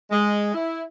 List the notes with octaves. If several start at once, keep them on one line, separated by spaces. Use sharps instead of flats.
G#3
E4